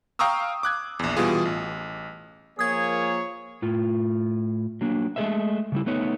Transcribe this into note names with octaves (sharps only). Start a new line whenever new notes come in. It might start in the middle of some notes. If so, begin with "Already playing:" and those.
F5 G5 A#5 C#6 D#6 E6
D6 F#6 G#6
A#1 E2
B2 E3 G3 F4 G#4
A1
F3 A#3 G#4 C#5 D#6 G#6
A2 F4
F#3 A#3 D4
G#3 A3 G#4 C5 D#5 E5
C#3 G3 E4
A3 B3 D#4 C#5